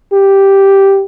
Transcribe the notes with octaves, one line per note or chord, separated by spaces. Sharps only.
G4